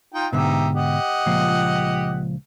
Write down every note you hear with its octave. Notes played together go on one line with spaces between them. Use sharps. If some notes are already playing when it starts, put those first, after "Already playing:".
D#4 F4 G5
G#2 B2 D3 D#4 G4 E5
G4 D#5 F#5
C#2 A#2 F3